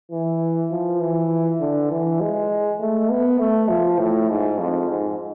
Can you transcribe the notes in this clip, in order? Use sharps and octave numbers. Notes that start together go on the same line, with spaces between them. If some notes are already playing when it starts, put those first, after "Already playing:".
E3
F3
E3
D3
E3
G#3
A3
B3
A3
F3
A2
G#2
F2
G#2